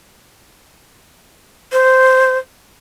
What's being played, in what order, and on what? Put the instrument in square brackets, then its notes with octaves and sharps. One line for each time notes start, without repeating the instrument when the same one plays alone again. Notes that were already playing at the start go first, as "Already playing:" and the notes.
[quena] C5